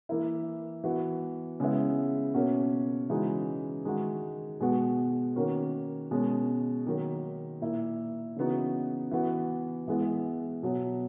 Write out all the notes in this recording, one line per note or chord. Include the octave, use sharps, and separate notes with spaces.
E3 A#3 E4
E3 B3 F#4
C#3 G#3 B3 E4
B2 A#3 C#4 F#4
C#3 E3 G#3 D#4 F#4
D#3 G#3 D#4 F#4
B2 G#3 B3 F#4
D#3 A#3 C#4 F#4
B2 G#3 C#4
D#3 F#3 A#3
A#2 A#3 E4
C#3 E3 B3 D#4 F#4
E3 B3 F#4
E3 G#3 B3 E4
B2 F#3 B3